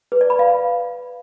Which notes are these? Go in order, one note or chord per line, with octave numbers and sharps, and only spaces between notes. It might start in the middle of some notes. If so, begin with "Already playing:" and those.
B4
D5
B5
F5